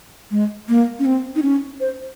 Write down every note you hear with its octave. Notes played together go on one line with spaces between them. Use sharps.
G#3
A#3
C#4
C4
D#4
C#4
C5